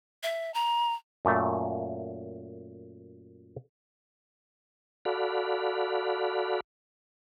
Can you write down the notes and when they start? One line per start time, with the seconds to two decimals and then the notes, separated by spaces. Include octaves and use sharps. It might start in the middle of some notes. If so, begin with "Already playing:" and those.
0.23 E5
0.54 A#5
1.25 F#2 A#2 A3
5.05 F#4 A4 D5 F5 B5